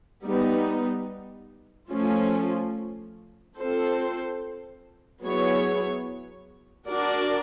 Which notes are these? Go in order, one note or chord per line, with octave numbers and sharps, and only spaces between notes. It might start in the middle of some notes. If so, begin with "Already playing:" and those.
G3 B3 D#4
F3 A3 C#4 F4
C4 F4 A4 C5
F#3 B3 E4 G#4 C#5
D4 F#4 A#4 D5